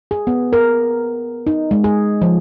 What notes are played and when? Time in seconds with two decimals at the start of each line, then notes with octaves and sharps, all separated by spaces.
0.11 G#4
0.27 B3
0.53 A#4
1.47 D#4
1.71 G#3
1.84 G#4
2.22 F3